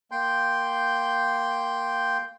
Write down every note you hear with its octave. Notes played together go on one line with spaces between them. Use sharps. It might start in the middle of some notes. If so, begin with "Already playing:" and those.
A#3 G5 C6 G6